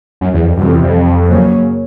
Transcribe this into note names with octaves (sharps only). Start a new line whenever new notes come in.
F#2
E2
F2
F#2 C3 E3 G3
F2
E2
F2
F#2 C#3 F#3 A#3 C#4